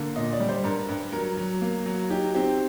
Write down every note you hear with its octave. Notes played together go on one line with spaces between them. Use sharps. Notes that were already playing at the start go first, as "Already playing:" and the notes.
Already playing: D3 A#3
A#2 D#5
D5
G3
C5
G2 A#4
G2
F#3 A#4
F#3
A#3
F#3
D#4 G4
C4 G4